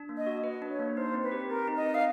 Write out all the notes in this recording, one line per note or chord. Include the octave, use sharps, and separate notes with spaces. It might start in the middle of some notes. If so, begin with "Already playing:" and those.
Already playing: D4
A#3
D#5
F#4
B4
D4
C#5
A#3
D#4 C5
C4
B4
G4
C4 A#4
D#4
D#5
C4
F5